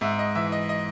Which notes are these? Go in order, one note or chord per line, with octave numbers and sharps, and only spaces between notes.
G#2 E5
D#5
E3 E5
D#5
D#5